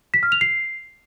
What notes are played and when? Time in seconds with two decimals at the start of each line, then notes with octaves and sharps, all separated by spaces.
0.14 B6
0.23 F6
0.32 F7
0.41 C7